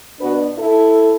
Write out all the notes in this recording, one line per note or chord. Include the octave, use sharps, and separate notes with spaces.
B2 B3 D4 F#4 B4
E4 A4